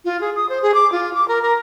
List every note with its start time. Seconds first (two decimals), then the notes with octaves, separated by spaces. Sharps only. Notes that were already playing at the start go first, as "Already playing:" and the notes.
0.05 F4
0.21 G#4
0.36 D#6
0.49 C5
0.62 G#4
0.74 D6
0.92 F4
1.14 D6
1.28 A#4
1.42 A#4